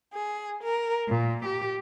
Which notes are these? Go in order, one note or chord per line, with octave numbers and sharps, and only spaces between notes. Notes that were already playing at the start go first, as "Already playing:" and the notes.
G#4
A#4
A#2
G4